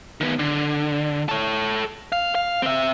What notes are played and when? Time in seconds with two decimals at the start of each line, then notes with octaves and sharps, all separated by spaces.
0.21 D#3 B3
0.39 D3
1.29 A4 C#5
2.12 F5
2.35 F5
2.62 C4 E5